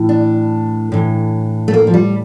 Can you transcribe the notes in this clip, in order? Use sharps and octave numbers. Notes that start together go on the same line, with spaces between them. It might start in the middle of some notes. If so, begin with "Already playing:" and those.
Already playing: A2 E3
D4
A2 E3
A3
A#3
F3
G3